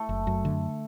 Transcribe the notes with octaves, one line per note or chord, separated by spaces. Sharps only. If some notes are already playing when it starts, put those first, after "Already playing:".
Already playing: A3 A4
F#1
F#2
D3